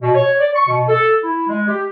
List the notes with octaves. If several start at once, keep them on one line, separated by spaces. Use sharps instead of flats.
B2
C#5
D5
C#6
B2
A4
E4
G#3
G4